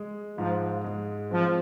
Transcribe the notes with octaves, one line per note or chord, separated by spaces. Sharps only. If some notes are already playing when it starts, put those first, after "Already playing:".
Already playing: G#3
G#2 F3
G#3
F3 C4